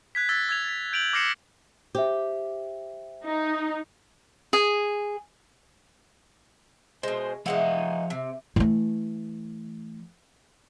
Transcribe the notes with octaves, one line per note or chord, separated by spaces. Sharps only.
F#6 G#6 B6
E6 F#6 G#6 A6
E6 G#6 F7
A6 B6
G6 D7 F7 F#7
D6 F6 A#6 C7 C#7 E7
G4 C5 E5
D#4
G#4
B2 G#3 C5
E3 F3 G#3 D#4 F5 F#5
C3
E3 A3